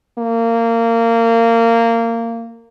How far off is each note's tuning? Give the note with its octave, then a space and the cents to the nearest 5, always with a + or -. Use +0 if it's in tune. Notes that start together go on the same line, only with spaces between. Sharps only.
A#3 -20